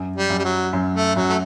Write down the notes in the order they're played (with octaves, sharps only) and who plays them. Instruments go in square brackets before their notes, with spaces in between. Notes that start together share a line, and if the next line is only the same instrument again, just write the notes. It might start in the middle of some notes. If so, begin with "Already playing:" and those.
Already playing: [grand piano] F#2
[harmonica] G3
[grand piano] F#2
[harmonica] G3
F#3
[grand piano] F#2
[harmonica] A3
[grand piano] F#2 [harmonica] F#3
[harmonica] A3